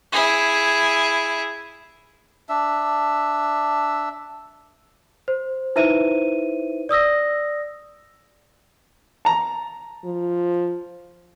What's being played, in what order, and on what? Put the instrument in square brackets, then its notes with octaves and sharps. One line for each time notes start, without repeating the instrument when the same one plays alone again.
[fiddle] E4 G#4
[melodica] D4 E5
[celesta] C5
D#4 E4 B4 C5 E5 D#7
D5 D#6 E6 A#6
[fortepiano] A5 A#5
[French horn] F3